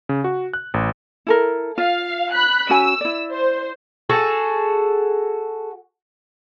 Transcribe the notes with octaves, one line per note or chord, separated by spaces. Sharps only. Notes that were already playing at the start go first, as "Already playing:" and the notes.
C#3
F#4
F#6
A1
E4 A4 A#4
F4 F5
B5 F#6
C#4 F#4 G#5 E6
E4 D5
C5
F#4 G#4 A4